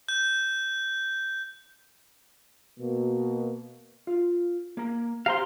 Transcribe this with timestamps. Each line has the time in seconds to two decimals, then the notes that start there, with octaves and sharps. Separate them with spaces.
0.09 G6
2.79 B2 A#3
4.07 F4
4.77 A#3 A#5
5.26 G4 C5 F5 A#5 C6